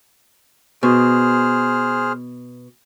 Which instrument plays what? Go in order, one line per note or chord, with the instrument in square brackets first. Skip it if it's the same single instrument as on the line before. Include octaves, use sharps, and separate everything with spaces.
[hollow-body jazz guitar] B2 [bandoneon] G#4 C5 F6